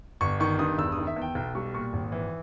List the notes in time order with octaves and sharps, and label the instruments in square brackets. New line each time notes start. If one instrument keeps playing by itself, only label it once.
[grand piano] G1 C#6
D#3 C#6
G2 D#6
E1 E6
D#6
D#3
E5
E2
G5
B1 G5
G3 C#6
A#2 C#6
G#1
E3